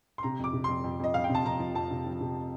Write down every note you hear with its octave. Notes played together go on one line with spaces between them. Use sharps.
C6
C3 A#5
F2 D6
C3
F2 C6
F2
F2 D#5
F2 F5
G5
C3
A5
F2 A#5
F3
F2 A5
C3
F3
C3